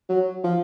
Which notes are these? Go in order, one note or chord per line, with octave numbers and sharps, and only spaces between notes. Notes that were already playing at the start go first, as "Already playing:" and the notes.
F#3
F3